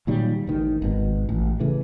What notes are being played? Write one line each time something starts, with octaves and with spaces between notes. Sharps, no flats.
A#2 D#3 F#3 G3
A1 D#3
G#1 B2
A1
C#3 E3 A3